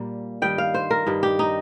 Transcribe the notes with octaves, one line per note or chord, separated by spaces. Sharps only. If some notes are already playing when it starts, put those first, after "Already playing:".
Already playing: A#2 G3 A#3
G2 D#3 G3 G5
F5
C5
A#4
G2 D#3 G3
G4
D#4